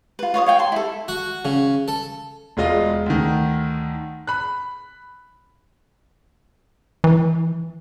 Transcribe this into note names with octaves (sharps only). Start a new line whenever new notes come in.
F4 B4
F4 C#5 D5 D#6
C#5 F5 G5
A5 C6
E4 A4
F#4
C#3
A4
E1 G#3 F4 D#5 F5
D2 D#3
B5 F#6
E3